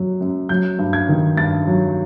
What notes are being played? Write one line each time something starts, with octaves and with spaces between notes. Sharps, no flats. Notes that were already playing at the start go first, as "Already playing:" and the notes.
Already playing: F#2 F#3
F#2
F#3 G6
G2
G#6
D#3
G2 A6
F#3